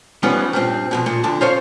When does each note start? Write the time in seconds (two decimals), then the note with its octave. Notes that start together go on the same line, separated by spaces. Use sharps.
0.23 E3 F3 G3 B3 C#4 D#4
0.53 G2 A#2 C4
0.91 F2 G#2 B2
1.06 A#2
1.24 F2 D3 A5
1.41 F4 C5 C#5 F5